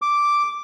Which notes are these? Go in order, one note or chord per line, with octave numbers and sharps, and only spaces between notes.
D6